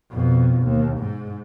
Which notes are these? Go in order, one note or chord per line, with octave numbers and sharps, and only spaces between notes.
F2 B2
D#2
G#2